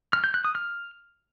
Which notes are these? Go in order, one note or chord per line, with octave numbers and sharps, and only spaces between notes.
F6
G6
F#6
D#6
F6